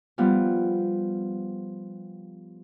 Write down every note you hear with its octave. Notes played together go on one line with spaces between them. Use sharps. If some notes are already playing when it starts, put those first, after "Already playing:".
F3 G3 B3